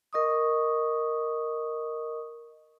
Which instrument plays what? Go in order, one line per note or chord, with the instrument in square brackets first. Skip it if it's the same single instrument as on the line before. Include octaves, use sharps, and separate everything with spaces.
[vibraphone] A#4 D#5 C#6 D#6